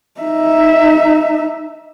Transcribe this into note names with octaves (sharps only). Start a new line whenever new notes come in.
D#4 E5